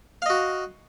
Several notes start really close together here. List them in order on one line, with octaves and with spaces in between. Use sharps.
F5 D#5 F#4